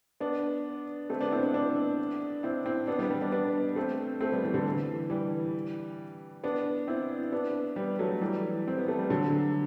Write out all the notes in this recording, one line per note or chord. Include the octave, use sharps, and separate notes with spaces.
B3 D4
A3 C4
B3 D4
C4 E4
B3 D4
B3 D4
C4 E4
C4 E4
B3 D4
G3 B3
G3 B3
B3 D4
B3 D4
A3 C4
A3 C4
G3 B3
E3 G3
D3
E3
E3 G3
B3 D4
C4 E4
B3 D4
G3 B3
F#3 A3
E3 G3
C4
B3
A3
G3
D3 F#3